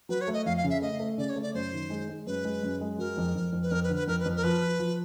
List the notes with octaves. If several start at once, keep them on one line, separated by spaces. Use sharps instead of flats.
F#3 B4
C#5
A3
D#5
F2 F5
F5
C#3
E5
A3 D#5
A3
C#3 D5
C#5
A3
D5
F#2 C5
D#3
G#3
G#3
F#2 B4
G#3
F#2
G#3
F#3 A#4
F2
F2
F2
B4
F2 A#4
B4
D3
B4
F2 A#4
B4
F2
A#4
F3 B4
F3
F3